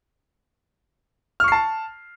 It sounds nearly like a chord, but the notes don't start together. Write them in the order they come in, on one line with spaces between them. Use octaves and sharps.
F6 C#6 C7 A5